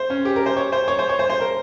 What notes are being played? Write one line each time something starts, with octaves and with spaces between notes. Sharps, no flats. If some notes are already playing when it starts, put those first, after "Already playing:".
Already playing: C5
C#4
G4
A#4
C5
C#5
C5
C#5
C5
C#5
C5
C5
A#4